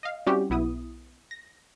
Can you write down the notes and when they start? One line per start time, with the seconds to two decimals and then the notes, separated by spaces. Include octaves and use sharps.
0.03 D#5 F5
0.26 G3 C4 C#4 E4 F#4 G4
0.50 B1 B3 E4 D#6
1.31 A#6